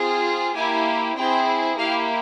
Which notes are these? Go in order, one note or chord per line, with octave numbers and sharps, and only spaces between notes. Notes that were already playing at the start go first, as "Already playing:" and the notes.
Already playing: C4 F4 G#4
A#3 E4 G4 G#5
C4 E4 G#4 G5
A#3 E4 G4 F5